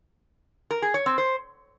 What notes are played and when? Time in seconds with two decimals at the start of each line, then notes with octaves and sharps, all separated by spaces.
0.71 A#4
0.82 G#4
0.94 C#5
1.06 C4
1.18 C5